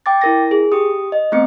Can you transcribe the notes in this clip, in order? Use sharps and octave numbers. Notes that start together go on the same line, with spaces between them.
G5 D6 A6
E4 A#4 A#6
G#4
G4 D#6
D#5
A3 B3 C4 D#5 C#7